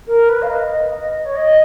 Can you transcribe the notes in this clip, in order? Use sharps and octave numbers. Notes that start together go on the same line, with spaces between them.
A#4
B4
F5
D#5
C#5
D#5